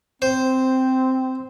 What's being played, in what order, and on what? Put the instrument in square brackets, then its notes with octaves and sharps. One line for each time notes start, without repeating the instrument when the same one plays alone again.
[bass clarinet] C4 [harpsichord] C5